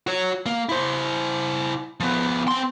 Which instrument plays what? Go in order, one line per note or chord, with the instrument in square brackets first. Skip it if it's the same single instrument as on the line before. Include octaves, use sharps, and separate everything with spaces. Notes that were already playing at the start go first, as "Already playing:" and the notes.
[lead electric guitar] F#4 C#5
A#3
E4 C5
F3 B3
C4 C6